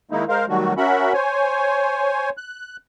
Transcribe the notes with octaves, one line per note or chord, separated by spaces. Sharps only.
D#3 G#3 A#3 D#4 E4
G#3 A#4 C5 F5
D#3 F#3 G3 A3 F#4
C#4 F#4 A#4 E5 F#5 B5
C5 C#5 G#5
F#6